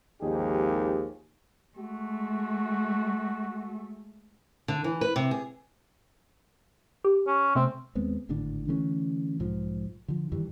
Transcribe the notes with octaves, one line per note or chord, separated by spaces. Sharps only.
G#1 D#2 F3 D#4 G4 G#4
G#3 A3 F#4
D3
E3
B4
C3
G#4
G4
C#4
C3 A3 C4
D#2 G#3 B3 C4
G#1 A2 D3 D4
D3 E3 A3 C#4
B1 G#2 F3
D3 F3
G2 D#3 E3 G3